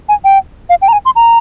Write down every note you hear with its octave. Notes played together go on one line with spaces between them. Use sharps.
G#5
G5
F5
G5
A#5
G#5
C6
A#5